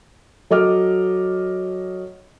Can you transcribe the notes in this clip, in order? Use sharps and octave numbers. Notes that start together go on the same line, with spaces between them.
F#3 A4 D#5 D6 F6